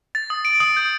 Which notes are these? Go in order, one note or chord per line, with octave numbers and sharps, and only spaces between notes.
A6
D#6
D7
D#6
G6